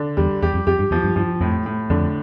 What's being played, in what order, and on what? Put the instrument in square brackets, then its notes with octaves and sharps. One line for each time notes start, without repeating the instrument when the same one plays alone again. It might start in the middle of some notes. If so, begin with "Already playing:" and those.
Already playing: [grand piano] D3
[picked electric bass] E2 [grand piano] G3
[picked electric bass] E2 [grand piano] G4
[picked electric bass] F2
[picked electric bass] F2 [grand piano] G4
[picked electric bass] G2
[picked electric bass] E2 [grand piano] F3
[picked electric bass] G2
[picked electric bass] G2 [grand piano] F3
[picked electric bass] F2 [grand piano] A2
[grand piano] A2
[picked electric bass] F2 [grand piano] D3